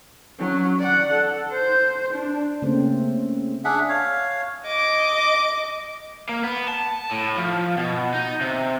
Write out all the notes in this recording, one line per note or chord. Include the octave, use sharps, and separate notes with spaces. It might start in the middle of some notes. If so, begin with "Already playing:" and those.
F#3 C#4
D5 F#5
A4
C5
D4
C#3 A3 A#3 C4 C#4 C5
D4 G#4 E5 F#5
C#5 F5
D#5 D6
A#3
B3
A5
A2
F3
B2
D#4
C3